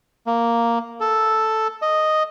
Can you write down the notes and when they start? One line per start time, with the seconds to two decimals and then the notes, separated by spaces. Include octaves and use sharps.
0.27 A#3
1.00 A4
1.82 D#5